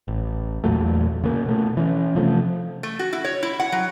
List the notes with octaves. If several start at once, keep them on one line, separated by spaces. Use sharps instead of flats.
A1
E2 A#2 F#3 A3
C#3 A#3
B2 A3
E3 C#4
C3 F3 A3
A3
F#4
E4
C#5
E4
F#5
F#3